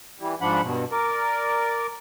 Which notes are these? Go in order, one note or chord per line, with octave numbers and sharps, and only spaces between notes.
E3 G3
G#2 F3 D4 F#5 B5
G2 B2
A#4 D5